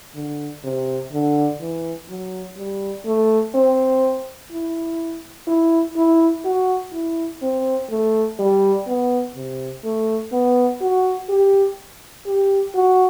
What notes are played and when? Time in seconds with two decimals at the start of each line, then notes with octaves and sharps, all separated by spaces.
0.15 D3
0.64 C3
1.12 D3
1.60 E3
2.09 F#3
2.57 G3
3.06 A3
3.55 C4
4.51 E4
5.47 E4
5.96 E4
6.45 F#4
6.93 E4
7.42 C4
7.91 A3
8.39 G3
8.87 B3
9.36 C3
9.84 A3
10.32 B3
10.81 F#4
11.29 G4
12.26 G4
12.75 F#4